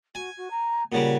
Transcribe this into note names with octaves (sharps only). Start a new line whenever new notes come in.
F#4 G#5
F#4
A#5
A#2 C#3 G3 F#5